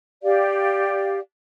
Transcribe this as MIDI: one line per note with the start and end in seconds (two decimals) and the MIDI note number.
0.23 1.19 67
0.23 1.19 74
0.23 1.19 77